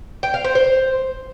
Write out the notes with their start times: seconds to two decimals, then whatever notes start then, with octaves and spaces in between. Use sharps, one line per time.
0.23 G5
0.34 F5
0.44 C5
0.55 C5